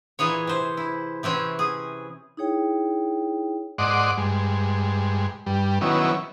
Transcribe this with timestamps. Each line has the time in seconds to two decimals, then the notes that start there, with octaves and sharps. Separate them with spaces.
0.19 A#2 E3 G#4 C#5
0.47 C3 C5
0.77 E4
1.23 C3 E3 C4 C#4
1.59 G#4
2.37 D#4 E4 G#4 C#5 G5
3.78 G#2 D5 D#5 F#5 C6 D6
4.17 G2 G#3
5.46 G2 G3
5.81 D#3 F#3 B3 C#4 E4